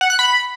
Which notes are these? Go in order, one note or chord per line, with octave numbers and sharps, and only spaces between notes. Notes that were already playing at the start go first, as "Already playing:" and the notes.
F#5
F#6
B5